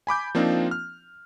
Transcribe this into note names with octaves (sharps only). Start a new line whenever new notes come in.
G#5 B5 D6 G6
F3 A#3 C4 D4 D#4 F4
F6